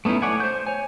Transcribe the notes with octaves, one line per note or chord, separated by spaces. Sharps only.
A3 B3 C#4 D#4 E4
A3 C#5 D5 F#5 G#5
C5 G6
C#5 G#5